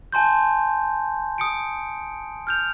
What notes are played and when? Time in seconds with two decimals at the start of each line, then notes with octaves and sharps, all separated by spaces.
0.12 G#5 A5 C6 G6
1.38 D#6 C#7 D7
2.47 F6 G6 F7